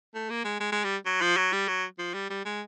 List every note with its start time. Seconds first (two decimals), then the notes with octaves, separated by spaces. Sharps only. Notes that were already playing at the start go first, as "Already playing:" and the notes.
0.15 A3
0.30 A#3
0.45 G#3
0.61 G#3
0.72 G#3
0.84 G3
1.06 F#3
1.22 F3
1.37 F#3
1.53 G3
1.68 F#3
1.99 F3
2.14 G3
2.30 G3
2.46 G#3